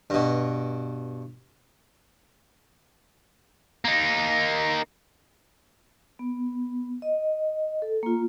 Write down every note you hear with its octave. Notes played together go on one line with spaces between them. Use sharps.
G2 B2
A#3 D#4
B3
D#5
A4
A#3 F4